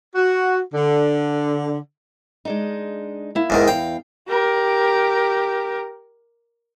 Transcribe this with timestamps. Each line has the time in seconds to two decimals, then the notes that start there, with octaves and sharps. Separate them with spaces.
0.15 F#4
0.74 D3
2.45 G#3 D4 D#4
3.35 A#3 E4
3.50 E2 G#2 D#3
3.68 E2 F5 G5
4.29 G4 A#4